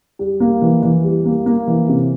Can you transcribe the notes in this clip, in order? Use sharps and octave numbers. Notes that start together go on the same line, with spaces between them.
G3
A#3
E3
E3
G3
A#3
A#3
E3
C3